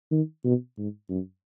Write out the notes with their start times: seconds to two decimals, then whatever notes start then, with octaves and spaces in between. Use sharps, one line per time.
0.11 D#3
0.44 B2
0.78 G#2
1.09 F#2